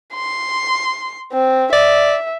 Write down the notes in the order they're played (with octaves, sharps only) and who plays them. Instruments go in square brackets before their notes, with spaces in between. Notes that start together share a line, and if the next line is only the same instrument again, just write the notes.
[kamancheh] C6
C4
[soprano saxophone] D5 [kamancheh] E5